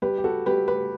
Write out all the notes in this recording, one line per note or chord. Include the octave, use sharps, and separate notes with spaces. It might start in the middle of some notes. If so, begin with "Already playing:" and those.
G3 G4 B4
G4
F#4 A4
G3 G4 B4
G4 B4